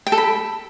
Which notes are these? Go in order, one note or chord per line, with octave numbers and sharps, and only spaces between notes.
G5
A4
B5